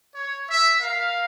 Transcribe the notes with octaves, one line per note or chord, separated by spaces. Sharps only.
C#5
E5
A#4 F5